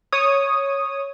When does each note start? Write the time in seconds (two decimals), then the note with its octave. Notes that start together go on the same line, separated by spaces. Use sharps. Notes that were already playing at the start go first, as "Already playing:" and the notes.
0.12 C#5 D#6